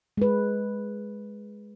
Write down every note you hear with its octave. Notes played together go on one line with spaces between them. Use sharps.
G#3 B4